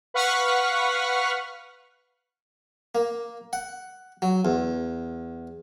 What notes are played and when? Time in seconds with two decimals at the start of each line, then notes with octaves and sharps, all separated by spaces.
0.14 B4 F5 F#5 C#6 F6 B6
2.95 A#3
3.53 F#5
4.22 F#3
4.45 E2